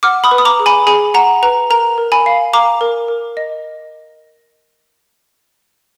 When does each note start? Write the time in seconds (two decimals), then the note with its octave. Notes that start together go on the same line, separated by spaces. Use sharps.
0.03 F#5 D6 F6
0.24 B5 D#6
0.31 B4
0.38 D#6
0.45 A#5 D6
0.60 G#4
0.66 G#5 B5
0.87 G#4 G#5 B5
1.14 F#5 A#5
1.43 B4 A#5
1.70 A#4 A#5
1.98 A#4
2.12 G#5 B5
2.26 F5
2.53 F5 A#5 D6
2.81 A#4
3.08 A#4
3.37 D#5